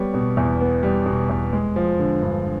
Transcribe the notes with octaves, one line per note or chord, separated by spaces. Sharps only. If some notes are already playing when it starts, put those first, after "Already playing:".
Already playing: G3 B3 C#5
B2
E2
B3
G3
B2
E2
G#3
F3
D3
G2